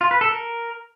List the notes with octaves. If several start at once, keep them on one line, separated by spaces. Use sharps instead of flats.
F4
B4
A4
A#4